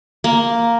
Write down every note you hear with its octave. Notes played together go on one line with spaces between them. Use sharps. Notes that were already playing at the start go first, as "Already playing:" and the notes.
A#3